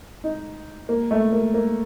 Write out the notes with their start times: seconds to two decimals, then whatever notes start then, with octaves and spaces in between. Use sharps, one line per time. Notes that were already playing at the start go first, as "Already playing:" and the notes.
0.24 D#4
0.89 A#3
1.11 A3
1.32 A#3
1.54 A#3